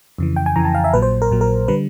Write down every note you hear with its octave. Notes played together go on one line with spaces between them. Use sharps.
F2 C#3 E3
G5
G#5
F2 C#3 E3 A#5
A5
F5
E5
A#1 A#2 F#3 B4
C5
A#4
A#1 A#2 F#3
A#4
D3 G3 B4